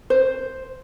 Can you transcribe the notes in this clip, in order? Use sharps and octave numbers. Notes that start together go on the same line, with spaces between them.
C5